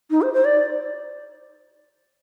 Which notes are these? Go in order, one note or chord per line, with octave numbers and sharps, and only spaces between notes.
D#4
C5
C5
D5